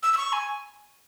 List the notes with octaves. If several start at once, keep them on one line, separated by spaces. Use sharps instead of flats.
E6
E6
C#6
G#5